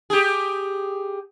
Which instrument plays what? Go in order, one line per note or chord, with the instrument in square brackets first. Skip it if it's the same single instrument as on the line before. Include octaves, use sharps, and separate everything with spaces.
[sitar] G4 G#4